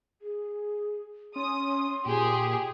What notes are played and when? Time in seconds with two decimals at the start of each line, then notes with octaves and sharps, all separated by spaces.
0.22 G#4
1.36 C#4 C6 D#6
2.06 A#2 G4 G#4